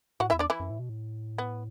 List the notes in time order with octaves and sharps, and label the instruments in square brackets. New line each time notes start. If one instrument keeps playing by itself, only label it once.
[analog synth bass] A2 [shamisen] F#4 F#5
[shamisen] E4 E5
[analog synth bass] E2
[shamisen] D4 D5
E3 E4
[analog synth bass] F#2
A2
B2
A2
[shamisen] B3